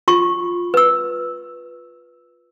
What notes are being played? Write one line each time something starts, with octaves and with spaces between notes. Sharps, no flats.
F4 C#6
B4 E6